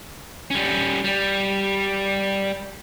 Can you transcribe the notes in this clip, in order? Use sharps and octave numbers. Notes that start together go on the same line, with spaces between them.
G3 C#4
G3